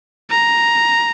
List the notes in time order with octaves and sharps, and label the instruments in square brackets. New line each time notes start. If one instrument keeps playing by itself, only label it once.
[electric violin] A#5